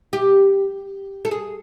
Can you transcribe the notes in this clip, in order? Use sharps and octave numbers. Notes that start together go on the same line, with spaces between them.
G4
A4
G#4